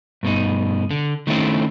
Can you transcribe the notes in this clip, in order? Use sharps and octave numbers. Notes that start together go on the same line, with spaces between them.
G2 B2 D#4
D3
D#3 A3 C4 C#4 E4 F4